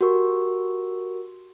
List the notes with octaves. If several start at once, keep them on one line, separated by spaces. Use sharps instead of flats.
F#4 G4 A#4 C#6